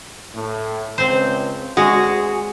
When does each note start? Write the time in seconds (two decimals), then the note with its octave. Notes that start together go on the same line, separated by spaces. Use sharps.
0.34 A2
0.98 C#2 C4 C5
1.77 D2 G#3 F#4 G#4